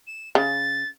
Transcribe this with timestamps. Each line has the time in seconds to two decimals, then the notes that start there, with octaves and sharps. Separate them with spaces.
0.07 E7
0.35 C#3 A6